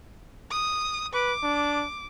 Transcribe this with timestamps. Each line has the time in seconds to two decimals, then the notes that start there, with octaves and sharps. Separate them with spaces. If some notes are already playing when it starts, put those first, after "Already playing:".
0.51 D#6
1.14 B4 D6
1.43 D4